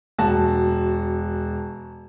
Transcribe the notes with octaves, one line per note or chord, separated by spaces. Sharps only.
E1 F#4 A5